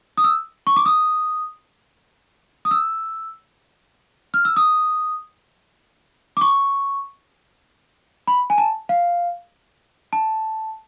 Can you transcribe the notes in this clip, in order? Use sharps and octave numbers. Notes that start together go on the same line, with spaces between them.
D#6
E6
C#6
D6
D#6
D#6
E6
F6
E6
D#6
D6
C#6
B5
G#5
A5
F5
A5